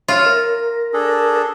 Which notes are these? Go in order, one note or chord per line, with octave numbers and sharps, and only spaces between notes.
F4 C#5 E5
A#4
D4 G#4 A4